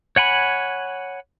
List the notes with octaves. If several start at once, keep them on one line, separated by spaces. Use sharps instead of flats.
C#5 F#5 G#5 B5